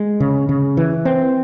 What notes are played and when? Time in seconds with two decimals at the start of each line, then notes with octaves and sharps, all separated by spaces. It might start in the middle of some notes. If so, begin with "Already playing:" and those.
Already playing: G#3
0.20 C#3
0.49 C#3
0.77 E3
1.05 C4